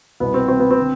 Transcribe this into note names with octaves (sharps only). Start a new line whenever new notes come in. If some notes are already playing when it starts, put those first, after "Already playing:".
C2 B2 B3
C4
C4
B3
C4
D3